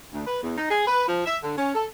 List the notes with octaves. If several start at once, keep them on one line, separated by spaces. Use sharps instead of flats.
D2
B4
E2
D#4
G#4
B4
F3
E5
D3
C#4
A4